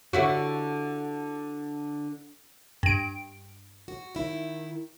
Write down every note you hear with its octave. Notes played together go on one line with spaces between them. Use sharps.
D3 E4 F#4
G2 D7
F#4
D#3 E4